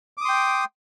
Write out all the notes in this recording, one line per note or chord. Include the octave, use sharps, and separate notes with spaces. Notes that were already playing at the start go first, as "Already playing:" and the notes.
G5 C6 D6 D#6